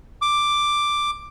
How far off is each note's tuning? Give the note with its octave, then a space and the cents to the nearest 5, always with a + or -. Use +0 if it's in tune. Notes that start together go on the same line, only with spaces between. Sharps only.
D6 +5